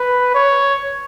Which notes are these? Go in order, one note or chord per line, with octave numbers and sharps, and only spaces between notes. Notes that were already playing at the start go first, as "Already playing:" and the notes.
Already playing: B4
C#5